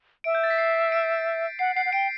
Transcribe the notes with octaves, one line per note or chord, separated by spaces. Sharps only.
E5 D7
G6
A6
B6
C7
D7
F#5 C7
F#5 C7
F#5
G5 D7